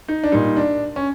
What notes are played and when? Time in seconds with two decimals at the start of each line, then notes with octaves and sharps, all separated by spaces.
0.08 D#4
0.24 D4
0.32 A#2 G3 D#4
0.57 D4
0.96 C#4